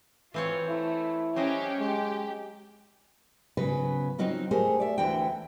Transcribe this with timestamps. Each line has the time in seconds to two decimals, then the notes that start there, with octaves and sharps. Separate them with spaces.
0.34 E3 C4 F4 C#5
0.69 A3 E4
1.36 F#3 C#4 G4 C5 D#5
1.80 G#3 G4
3.57 G#2 C#3 F#3 B3 B4
4.18 F#3 C4 D#4 F4 F#4
4.51 A3 G4 G#4 A#4 C5
4.80 D5 E5
4.98 D2 D3 E3 E4 F#4 G5